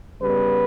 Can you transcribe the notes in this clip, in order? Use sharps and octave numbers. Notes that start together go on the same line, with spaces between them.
C#3 G3 B3 B4